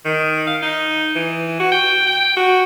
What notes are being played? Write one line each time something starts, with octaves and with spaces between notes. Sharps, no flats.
D#3
F5
D#4
E3
F#4
G5
G5
F#4